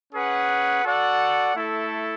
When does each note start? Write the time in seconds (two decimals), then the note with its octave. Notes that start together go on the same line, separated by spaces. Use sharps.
0.13 C#4 G#4 B4 F#5
0.84 F#4 A4 D5 F#5
1.55 A3 E4 A4